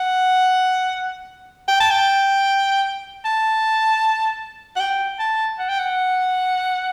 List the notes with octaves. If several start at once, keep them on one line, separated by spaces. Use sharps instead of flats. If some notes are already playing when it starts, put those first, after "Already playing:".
Already playing: F#5
G5
A5
G5
A5
F#5
G5
A5
F#5
G5
F#5